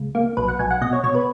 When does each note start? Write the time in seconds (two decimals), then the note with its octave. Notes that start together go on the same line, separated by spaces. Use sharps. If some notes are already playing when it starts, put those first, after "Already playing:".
Already playing: C#2
0.15 A#3
0.37 B1 B4
0.48 F#5
0.59 B1 G#5
0.71 F#5
0.81 B2 D#5
0.93 C#5
1.03 B2 C#5
1.15 B4